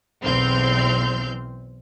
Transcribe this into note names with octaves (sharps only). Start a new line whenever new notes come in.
B1 E2 C4 C6 F6 G6